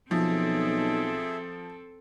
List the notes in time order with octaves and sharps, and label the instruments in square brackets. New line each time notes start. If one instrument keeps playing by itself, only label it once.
[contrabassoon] B1 [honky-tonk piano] F3 [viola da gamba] C4 A4 [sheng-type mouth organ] G#4 E5